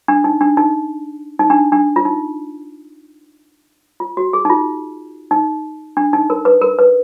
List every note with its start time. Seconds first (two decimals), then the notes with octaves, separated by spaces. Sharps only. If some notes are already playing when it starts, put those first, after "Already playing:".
0.08 D4
0.24 D#4
0.41 D4
0.57 D#4
1.39 D#4
1.50 D4
1.72 D4
1.96 F4
2.05 D#4
4.00 F4
4.17 F#4
4.33 G#4
4.45 D#4
4.50 F4
5.31 D#4
5.97 D4
6.13 D#4
6.30 A#4
6.45 B4
6.62 A#4
6.79 B4